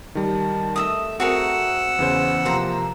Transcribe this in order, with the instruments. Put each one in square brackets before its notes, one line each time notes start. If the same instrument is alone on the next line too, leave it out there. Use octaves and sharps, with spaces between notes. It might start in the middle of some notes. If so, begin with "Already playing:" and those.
[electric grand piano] D#3 G3 [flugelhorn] A5
[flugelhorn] A3 [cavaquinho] D#5 E5 D#6
[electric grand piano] C4 [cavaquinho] F#4 G#4 A#4 [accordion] F#5 E6
[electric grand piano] E2 C#3 C5 [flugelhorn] B4
[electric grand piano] C3 F3 C4 [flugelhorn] A#3 [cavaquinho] C5 A#5